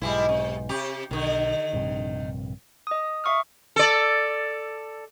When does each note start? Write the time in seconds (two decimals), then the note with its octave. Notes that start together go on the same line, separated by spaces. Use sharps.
0.01 B1 G#2 G3 G#3 E4
0.29 C3
0.69 C3 G4
1.11 B1 D3 D#3
1.73 A#1 G2 C3
2.87 D#5 D#6
3.24 E5 F5 C#6 D#6 F6
3.76 A4 D5